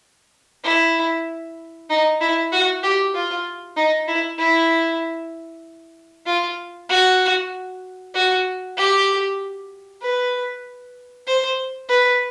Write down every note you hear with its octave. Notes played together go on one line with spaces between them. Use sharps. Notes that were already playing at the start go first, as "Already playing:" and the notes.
E4
D#4
E4
F#4
G4
F4
D#4
E4
E4
F4
F#4
F#4
G4
B4
C5
B4